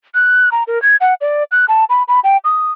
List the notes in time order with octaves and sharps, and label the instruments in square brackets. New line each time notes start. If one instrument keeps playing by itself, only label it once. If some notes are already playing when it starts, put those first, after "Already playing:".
[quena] F#6
A#5
A#4
G#6
F#5
D5
F#6
A5
B5
B5
G5
D#6